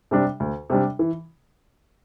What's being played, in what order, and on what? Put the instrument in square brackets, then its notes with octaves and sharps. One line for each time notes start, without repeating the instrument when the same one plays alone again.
[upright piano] C3 G3 D4
D2
C3 G3 D4
E3